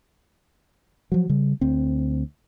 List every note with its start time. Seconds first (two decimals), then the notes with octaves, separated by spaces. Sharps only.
1.12 F3 F#3
1.29 C#3 G3
1.61 D2 C4